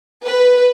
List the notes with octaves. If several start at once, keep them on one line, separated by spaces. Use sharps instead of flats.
B4